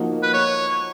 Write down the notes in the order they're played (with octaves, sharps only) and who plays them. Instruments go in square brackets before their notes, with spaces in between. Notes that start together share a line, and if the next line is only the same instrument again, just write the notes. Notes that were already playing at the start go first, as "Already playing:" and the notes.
Already playing: [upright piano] F3 A#3 D#4 F#4
[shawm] B4
C#5